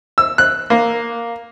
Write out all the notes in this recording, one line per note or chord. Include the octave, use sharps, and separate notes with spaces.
E6
F#6
A#3